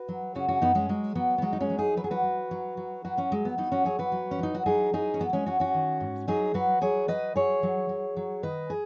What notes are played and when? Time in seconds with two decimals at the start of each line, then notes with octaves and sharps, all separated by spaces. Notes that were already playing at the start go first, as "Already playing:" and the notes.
Already playing: F#4 B4
0.08 F#3
0.35 C#3 C#4 F#4
0.48 C#4 F#4
0.61 F#2 B3 D#4
0.75 G#3 C#4
0.89 F#3 G#3
1.15 F#3 B3
1.38 B3
1.42 F#3 G#3
1.53 D#4
1.60 G#3 C#4
1.70 F#3
1.78 D#4 G#4
1.97 F#3 B4
2.04 G#4
2.11 F#4 B4
2.24 F#3
2.51 F#3
2.77 F#3
3.05 F#3 F#4 B4
3.17 C#4 F#4
3.32 F#3 G#3
3.45 B3
3.58 F#3 B3 D#4
3.72 C#4 F#4
3.85 F#3 G#4 C#5
3.99 F#4 B4
4.12 F#3
4.31 C#4
4.39 F#3 D#4
4.55 F#4
4.66 F#3 D#4 G#4
4.93 F#3 D#4 G#4
5.14 C#4
5.19 F#3 B3
5.30 B3
5.33 G#3 C#4
5.46 F#3 C#4 F#4
5.60 C#4 F#4
5.74 D#3
6.00 G#2
6.28 F#3 D#4 G#4
6.54 F#3 F#4 B4
6.81 F#3 G#4 C#5
7.08 F#3 B4 D#5
7.36 F#3 G#4 C#5
7.63 F#3
7.89 F#3
8.17 F#3
8.43 D#3 B4 D#5
8.70 G#4